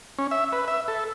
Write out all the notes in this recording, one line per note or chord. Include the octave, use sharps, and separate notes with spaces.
C#4
E5
B4
E5
A4